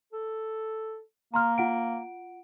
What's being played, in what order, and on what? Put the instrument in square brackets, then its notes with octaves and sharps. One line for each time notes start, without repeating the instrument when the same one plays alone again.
[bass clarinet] A4
[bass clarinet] A#3 [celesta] A#5 C6 F6
[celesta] F4 F#5 D7